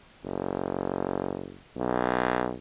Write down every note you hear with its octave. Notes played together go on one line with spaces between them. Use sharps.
F#1
B1